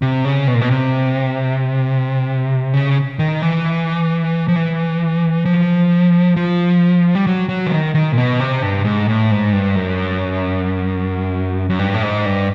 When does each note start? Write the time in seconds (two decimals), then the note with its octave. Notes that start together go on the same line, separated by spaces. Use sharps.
0.02 C3
0.25 C#3
0.48 B2
0.54 A#2
0.61 B2
0.70 C3
2.74 C#3
3.19 D#3
3.42 E3
4.48 F3
4.55 E3
5.45 F3
6.36 F3
7.15 G3
7.27 F#3
7.49 F#3
7.66 E3
7.72 D#3
7.95 D#3
8.12 A#2
8.18 B2
8.40 C3
8.62 G2
8.85 G#2
9.09 A2
9.31 G#2
9.53 G2
9.75 F#2
11.70 F#2
11.79 G2
11.94 A2
12.03 G#2
12.26 G2